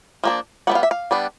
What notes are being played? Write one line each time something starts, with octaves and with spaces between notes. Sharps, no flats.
F3 A#3 D4
G3 B3 D4 F#5
F5
E5
F5
G3 B3 D4